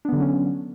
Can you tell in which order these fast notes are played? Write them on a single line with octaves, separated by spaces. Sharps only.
D4 B3 D3 F#3 C#4